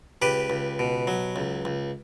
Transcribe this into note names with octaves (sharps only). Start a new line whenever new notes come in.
C#2 G4 B4
C#2
B2
F#3
C#2
C#2